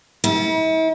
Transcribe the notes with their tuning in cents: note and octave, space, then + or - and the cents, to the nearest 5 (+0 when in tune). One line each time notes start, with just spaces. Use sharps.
E4 -45